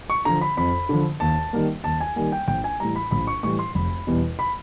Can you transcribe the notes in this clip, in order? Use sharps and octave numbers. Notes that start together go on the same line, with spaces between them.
C#6
D3 F3 A#5
B5
F2 B5
D3 F3
D#2 A5
D#3 G3 A#3
D#2 A5
G#5
D#3 G3 A#3 G#5
G5
A#1 G5
G#5
A2 E3 G3 A#5
B5
A#1 B5
C#6
A2 E3 G3 C#6
C6
F1 B5
E2 B2 G3
B5